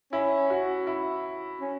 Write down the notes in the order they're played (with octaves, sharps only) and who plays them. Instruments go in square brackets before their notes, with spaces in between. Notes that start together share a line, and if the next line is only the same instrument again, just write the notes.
[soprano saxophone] C#4 [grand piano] E4
[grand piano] F#4
E4
[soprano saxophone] C#4